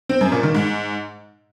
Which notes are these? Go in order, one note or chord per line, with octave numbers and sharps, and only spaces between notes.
C4
F#2
A#2
D#3
G#2